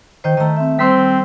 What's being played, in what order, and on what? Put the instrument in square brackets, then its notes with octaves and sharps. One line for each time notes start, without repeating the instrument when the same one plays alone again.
[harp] D#3 G6 [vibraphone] C5 D#5 G5
[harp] D#3 A3 [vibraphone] D#5 A#5
[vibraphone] C4 E5
[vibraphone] G3 C5 [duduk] C4 [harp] C6 E6 B6